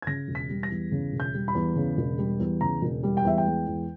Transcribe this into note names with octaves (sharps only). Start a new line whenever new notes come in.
G#6
C#3 A#6
E1
B6
G3
A#6
E2
C#3
E1
G6
G3
B5
E2
C#3
E1
G3
E2
C#3 A#5
E1
G3
G5
E2 E5
G5
G#3
E2